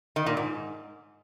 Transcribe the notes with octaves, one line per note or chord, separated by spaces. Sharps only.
D#3
A#2
G#2